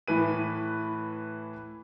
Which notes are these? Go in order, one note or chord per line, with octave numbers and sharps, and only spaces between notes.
A2 E3 B4 D#7